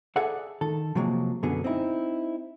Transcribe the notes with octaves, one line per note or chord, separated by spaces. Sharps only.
G#4 A4 D5 E5 F#5
D#3 A4
C3 F3 F#3 G#3 A#3
F#2 B2 D3 B3 G#4
C4 D#4 E4